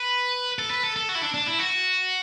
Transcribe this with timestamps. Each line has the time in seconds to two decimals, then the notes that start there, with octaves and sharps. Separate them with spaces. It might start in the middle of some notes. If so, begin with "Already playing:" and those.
Already playing: B4
0.59 A4
0.70 B4
0.83 A4
0.96 A4
1.09 F#4
1.15 E4
1.22 D4
1.34 D4
1.46 E4
1.59 F#4